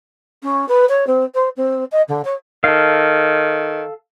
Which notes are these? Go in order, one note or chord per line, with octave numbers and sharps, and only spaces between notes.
C#4
B4
C#5
C4
C5
C4
D#5
D3
C#5
D#3 A4 F5